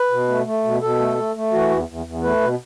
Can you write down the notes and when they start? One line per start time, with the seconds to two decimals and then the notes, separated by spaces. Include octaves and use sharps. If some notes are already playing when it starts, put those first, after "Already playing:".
Already playing: B4
0.11 B2
0.28 A3
0.46 A3
0.64 B2
0.82 B2 A4
1.00 A3
1.18 A3
1.35 A3
1.53 E3 F#4
1.70 E2
1.88 E2
2.06 E2
2.23 A3 B4
2.41 B2